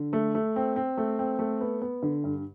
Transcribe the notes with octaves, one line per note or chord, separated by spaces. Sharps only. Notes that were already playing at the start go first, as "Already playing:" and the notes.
Already playing: D3
A3
A3
C4
C4
A3
C4
A3
B3
B3
D3
G2